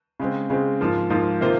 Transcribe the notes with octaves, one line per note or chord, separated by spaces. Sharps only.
C#3 G#3 C4
C#3 G#3 C4
G#2 F3 A#3 F4
G#2 F3 A#3 F4
C3 D#3 A#3 F4 C5